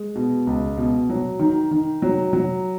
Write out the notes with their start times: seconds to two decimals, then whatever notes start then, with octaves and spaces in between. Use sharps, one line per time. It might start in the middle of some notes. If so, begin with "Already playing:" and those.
Already playing: G#3
0.15 B2
0.47 C#2
0.77 B2
1.10 F#3
1.39 D#3
1.71 D#3
2.02 F#3
2.33 F#3